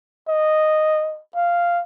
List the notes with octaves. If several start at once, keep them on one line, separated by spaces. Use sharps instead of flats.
D#5
F5